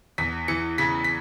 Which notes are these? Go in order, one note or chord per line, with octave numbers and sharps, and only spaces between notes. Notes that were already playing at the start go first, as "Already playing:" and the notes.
E2 B6
E3 C#7
C#3 B6
B6